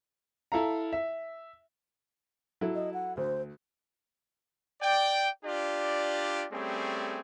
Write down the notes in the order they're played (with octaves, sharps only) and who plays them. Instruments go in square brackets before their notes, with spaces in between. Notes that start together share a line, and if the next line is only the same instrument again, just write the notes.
[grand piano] E4 A4 F5 A#5
E5
[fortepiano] F#3 E4 A4
[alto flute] D#5
F#5
[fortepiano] D2 [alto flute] C5
[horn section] D5 G5
D4 F4 G4 D5
G3 A3 C4 C#4 G#4